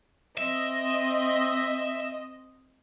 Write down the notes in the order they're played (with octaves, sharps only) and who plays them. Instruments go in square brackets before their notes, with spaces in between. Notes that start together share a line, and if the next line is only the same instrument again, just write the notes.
[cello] C4 [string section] D#5 [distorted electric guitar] E5